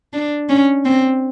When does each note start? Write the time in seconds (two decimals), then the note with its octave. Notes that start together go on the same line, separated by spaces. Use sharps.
0.13 D4
0.49 C#4
0.85 C4